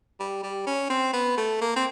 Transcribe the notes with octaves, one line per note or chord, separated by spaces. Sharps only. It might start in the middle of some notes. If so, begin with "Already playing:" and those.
G3
G3
C#4
C4
B3
A3
A#3
C4